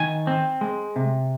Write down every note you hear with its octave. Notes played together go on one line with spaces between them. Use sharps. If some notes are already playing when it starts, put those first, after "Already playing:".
Already playing: D#3 G#5
C4
G#3
C3